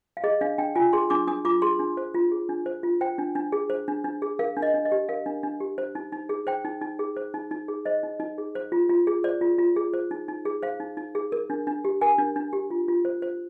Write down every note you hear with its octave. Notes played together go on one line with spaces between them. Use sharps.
F5
G#4 D#5
D4 F5
D4 G5
F4 G#5
G#4 C6
D4 D6
D4 D#6
F4 D6
G#4 C6
D4
C5
F4
G#4
D4
C5
F4
C5 G5
D4
D4
G#4
C5
D4
D4
G#4
A#4 F5
D4
D#5
D4
D#5
G4
A#4 F5
D4
D4
G4
C5
D#4
D#4
G#4
C5 G5
D#4
D#4
G#4
C5
D#4
D#4
G#4
C5 D#5
D#4
D#4
G#4
C5
F4
F4
G#4
C5 D5
F4
F4
G#4
C5
D#4
D#4
G#4
C5 F5
D#4
D#4
G#4
A#4
D4
D4
G4
A#4 G#5
D4
D4
G4
F4
F4
C5
C5